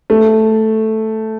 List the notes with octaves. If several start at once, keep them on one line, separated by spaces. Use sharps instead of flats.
A3